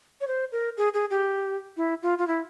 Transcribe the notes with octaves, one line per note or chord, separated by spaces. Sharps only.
C#5
C5
A#4
G#4
G#4
G4
E4
F4
F4
E4